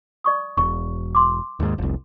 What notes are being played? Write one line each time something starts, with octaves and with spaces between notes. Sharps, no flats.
D5 C#6 D#6
E1 C#6
C6 D6
D#2 G#2
F1 C2